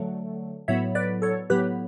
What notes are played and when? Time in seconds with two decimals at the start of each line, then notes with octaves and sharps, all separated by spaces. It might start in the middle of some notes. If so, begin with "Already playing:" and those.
Already playing: D3 F#3 A3
0.68 A2 F#3 B3 C#5 E5
0.95 B4 D5
1.22 A4 C#5
1.50 A2 F#3 B3 G4 B4